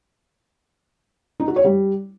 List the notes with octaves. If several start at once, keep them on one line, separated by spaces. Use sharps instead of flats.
D#4
F#4
C#5
G3